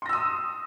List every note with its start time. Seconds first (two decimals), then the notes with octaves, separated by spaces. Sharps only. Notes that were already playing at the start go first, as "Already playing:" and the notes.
0.02 C6
0.06 A#6
0.09 E6
0.13 D#6